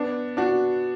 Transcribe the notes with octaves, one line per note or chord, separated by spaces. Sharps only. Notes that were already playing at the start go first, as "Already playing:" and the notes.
Already playing: B3 D4
D4 F#4